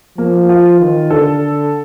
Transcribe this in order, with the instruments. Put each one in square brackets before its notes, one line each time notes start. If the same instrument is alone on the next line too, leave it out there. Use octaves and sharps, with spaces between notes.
[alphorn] F3 [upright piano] A#3
[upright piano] F4
[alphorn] D#3
[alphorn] D3 [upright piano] A4